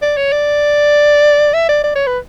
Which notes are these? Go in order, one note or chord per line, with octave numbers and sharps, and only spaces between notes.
D5
C#5
D5
E5
D5
D5
C#5
B4